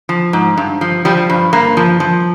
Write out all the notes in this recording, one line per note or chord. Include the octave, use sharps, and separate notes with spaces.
F3
G#2
G2
F3
F3 G3
G2
G2 A#3
F3
F3